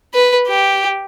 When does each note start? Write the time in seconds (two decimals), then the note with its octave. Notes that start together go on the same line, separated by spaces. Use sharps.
0.14 B4
0.48 G4